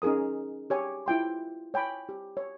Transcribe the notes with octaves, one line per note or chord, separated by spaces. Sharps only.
C#4 D#4 G#4 A#4 D#6
G4 C#5 G#5
E4 F4 G5 C6
C#5 G5 G#5 B5
G4
C#5